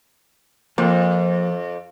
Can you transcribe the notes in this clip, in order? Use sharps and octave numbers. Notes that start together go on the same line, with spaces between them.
F2 F3 A#3